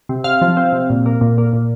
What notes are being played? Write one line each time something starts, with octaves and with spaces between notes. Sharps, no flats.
C3
C3 F5
F3
C4
C3
A#2
A#3
A#2
A#3
A#2